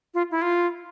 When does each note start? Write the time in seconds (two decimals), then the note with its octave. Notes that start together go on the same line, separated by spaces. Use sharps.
0.14 F4
0.31 E4
0.42 F4